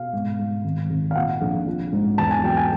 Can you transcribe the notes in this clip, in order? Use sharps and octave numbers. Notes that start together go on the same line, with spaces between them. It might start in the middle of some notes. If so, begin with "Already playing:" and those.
Already playing: B2 F5
G#2
G#2
G#1
G#1
F5
A#2 F#5
A#1
F3
G#2
E2 A5
G#5
F#3 G5
G#5